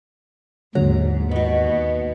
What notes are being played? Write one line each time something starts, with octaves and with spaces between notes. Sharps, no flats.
D#2 G#2 D3 F#3 A#5
B2 D#3 B3